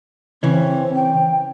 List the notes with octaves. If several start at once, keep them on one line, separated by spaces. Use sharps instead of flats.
C#3 E3 C4 C#4
G5